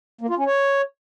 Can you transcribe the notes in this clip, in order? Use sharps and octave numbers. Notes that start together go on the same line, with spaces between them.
A#3
F4
C#4
C#5